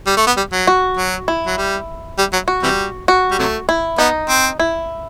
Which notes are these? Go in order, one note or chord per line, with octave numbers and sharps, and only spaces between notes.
G3
A3
B3
G3
F#3
F#4
F#3
E4
F#3
G3
G3
F#3
F#4
C3 E3 G3
F#4
G3
C3 F#3 A3
E4
B3 D#4
C4
E4